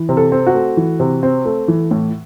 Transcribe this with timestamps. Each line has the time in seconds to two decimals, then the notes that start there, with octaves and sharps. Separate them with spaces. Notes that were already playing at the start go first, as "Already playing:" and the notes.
Already playing: E3
0.09 C3
0.17 A4
0.32 C4
0.47 F#4
0.54 A3
0.77 E3
1.00 C3
1.23 C4
1.45 A3
1.68 E3
1.91 A2